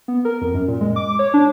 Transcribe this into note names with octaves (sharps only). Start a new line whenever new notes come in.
B3
A#4
F2
F#2
A#2
G#3
D6
C#5
D4